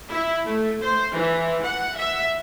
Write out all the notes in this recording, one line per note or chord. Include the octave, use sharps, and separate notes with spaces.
E4
A3
C5
E3
F#5
E5